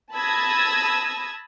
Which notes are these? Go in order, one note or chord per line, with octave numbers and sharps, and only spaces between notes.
A5 B5 D#6 E6 G#6 A#6